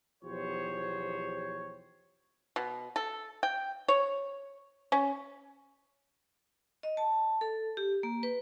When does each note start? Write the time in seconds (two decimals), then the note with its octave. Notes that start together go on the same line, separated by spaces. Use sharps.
0.23 B1 E2 F3 G4 C5 C#5
2.56 B2
2.96 A4
3.43 G5
3.88 C#5
4.92 C#4
6.83 D#5
6.97 A5
7.41 A4
7.77 G4
8.03 A#3
8.23 B4